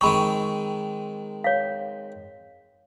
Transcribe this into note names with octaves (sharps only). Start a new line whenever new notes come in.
D#3 G#3 C4 B5 C#6
C#5 F5